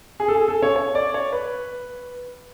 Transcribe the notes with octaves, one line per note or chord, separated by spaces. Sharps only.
G#4
A4
G#4
A4
C#5
C#5
D5
C#5
B4